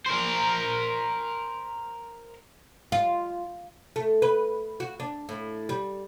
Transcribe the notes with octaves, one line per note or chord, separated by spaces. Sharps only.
A#4 C5
F4
A3
B4
F#4
D4
A2
G3